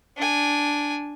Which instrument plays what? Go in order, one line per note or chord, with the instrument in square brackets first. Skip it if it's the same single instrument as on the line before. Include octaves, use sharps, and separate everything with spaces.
[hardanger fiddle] D4 G#5